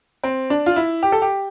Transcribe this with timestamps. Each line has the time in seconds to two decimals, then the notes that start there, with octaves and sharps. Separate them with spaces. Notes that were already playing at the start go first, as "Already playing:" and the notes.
0.24 C4
0.50 D4
0.66 F4
0.76 E4
1.03 G4
1.12 A4
1.22 G4